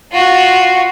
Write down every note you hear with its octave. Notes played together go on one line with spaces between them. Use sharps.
F4 F#4